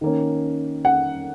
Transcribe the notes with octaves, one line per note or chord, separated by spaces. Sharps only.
D#3 A#3 C#4
F#5